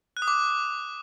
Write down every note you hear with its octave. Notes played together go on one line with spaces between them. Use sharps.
F#6
D#6
D6